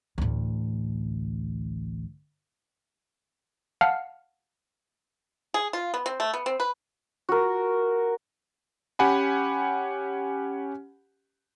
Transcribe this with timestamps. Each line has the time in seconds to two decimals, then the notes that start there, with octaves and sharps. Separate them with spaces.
0.18 A1 D2
3.81 F5 F#5 A5 F6
5.54 G#4
5.73 F4
5.94 B3
6.06 C4
6.20 A3
6.34 B3
6.46 C4
6.60 B4
7.29 F#4 A#4
8.99 C#4 G4 F#5 G#5 B5